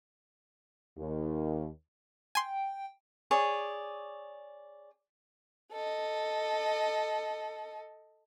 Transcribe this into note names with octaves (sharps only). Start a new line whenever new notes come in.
D#2
G5 G#5 C6
G#4 C#5 D5
A4 D#5